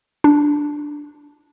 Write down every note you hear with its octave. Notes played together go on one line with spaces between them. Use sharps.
D4